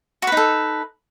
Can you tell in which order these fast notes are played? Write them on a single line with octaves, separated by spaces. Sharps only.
F#4 B4 D#4 A4